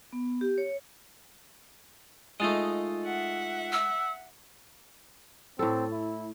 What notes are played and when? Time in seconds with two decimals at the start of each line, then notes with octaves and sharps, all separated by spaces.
0.13 B3
0.41 G4
0.58 C#5
2.40 G#3 A3 D#4 F4 D#5
3.05 E5 F#5
3.72 E6
5.59 A2 C4 A4
5.92 E4